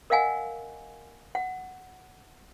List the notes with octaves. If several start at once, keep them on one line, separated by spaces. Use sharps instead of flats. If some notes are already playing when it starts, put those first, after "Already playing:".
A#4 D#5 F5 F#5 G#5
F#5